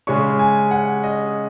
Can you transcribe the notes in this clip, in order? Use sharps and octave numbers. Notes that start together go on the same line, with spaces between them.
C#3 G#3 C#4 C#6
G#5
F#5
D#5